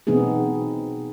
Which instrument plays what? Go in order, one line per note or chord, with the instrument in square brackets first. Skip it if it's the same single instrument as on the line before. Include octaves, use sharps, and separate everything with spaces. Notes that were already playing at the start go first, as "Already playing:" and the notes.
[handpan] B2 E3 B3 C4 D#4 G#4